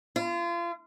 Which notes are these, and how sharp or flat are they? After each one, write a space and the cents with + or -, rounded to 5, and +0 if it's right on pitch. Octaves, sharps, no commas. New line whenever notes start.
F4 -30